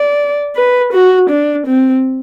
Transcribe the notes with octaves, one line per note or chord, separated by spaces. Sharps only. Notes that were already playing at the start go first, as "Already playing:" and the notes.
Already playing: D5
B4
F#4
D4
C4